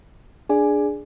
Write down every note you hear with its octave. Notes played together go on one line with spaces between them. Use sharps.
D4 G#4 D5 G#5